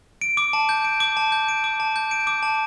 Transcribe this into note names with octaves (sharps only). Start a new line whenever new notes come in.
D7
D6
A5
G6
D7
D6
A5
G6
D7
D6
A5
G6
D7
D6
A5